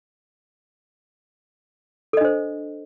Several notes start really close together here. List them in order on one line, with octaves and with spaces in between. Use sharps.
A4 D#5 D4 C5